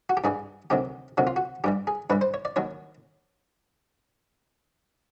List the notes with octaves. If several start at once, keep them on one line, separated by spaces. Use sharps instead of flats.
F#4
G4
G2 E3 G3 G#4
D2 C3 D#3 F#3 G4
D2 C3 D#3 F#3 F#4
F4
F#4
G2 E3 G3 G4
G#4
G2 E3 G3 B4
C5
C#5
D5
D#2 D#3 F#3 C#5